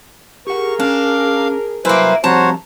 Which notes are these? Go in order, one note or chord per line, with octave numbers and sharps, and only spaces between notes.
G4 G#4 A#4 F#5 C#6
C#4 D4 F5
C2 F#3 A#3 E4 B4 C5 G#5
F3 G3 C4 F#4 C5 C#5 A5 A#5